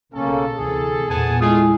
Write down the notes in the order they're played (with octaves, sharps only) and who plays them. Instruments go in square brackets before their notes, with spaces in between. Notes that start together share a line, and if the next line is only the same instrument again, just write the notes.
[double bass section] B1 [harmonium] C#3 A#3 C#4 [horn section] A4
[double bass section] D2 C3 E3 [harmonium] G#4
[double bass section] E2 A#2 [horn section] B3 G#5 A5
[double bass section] G#3 [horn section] A3 F4 G#4 [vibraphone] E4 G#5 D#6